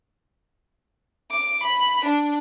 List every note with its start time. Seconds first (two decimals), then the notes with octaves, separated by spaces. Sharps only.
1.31 D6
1.63 B5
2.05 D4